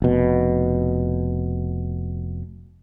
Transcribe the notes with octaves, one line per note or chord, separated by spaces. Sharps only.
F1 B2